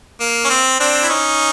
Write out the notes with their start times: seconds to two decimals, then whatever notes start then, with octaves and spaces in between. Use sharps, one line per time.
0.20 A#3
0.44 C#4
0.50 C4
0.80 C4 D4
1.03 E4
1.09 C#4 D#4